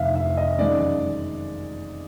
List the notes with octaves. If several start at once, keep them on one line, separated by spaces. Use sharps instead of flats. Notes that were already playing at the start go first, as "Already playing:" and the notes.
Already playing: F1 F2 C3 D#3 E5 F5
E5
D#5
F#2 D#3 G#3 D5